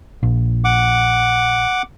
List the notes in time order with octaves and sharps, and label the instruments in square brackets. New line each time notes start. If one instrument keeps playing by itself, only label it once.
[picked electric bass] A#1
[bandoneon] F#5 D6